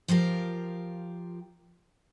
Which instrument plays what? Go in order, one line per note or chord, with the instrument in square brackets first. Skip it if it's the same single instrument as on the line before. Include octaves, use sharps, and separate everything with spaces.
[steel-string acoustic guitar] F3 F4 G4 A#4